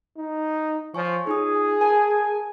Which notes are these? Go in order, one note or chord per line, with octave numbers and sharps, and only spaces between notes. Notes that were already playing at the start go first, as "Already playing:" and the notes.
D#4
F3 C#5 G#5 C#6
D#4 F4 G#4 D#6
A#4 G#5 A5